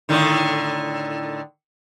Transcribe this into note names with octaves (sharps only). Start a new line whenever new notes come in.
A2 D3 D#3